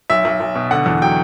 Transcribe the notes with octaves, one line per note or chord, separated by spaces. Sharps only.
B1 E5
B1
B1
B2
D3 F#5
E2
F#3 G5